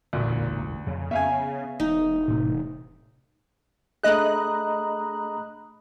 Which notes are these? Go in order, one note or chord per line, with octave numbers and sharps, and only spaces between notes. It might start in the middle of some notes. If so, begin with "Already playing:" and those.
E1 A1 D2 A#2
F2 C#3
B3 E5 F5 G#5
E1 D#4
A2 C3
A3 D4 G#4 D#5 A#5 B5 D#6 F#6